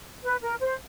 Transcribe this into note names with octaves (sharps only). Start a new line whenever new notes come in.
B4
A#4
C5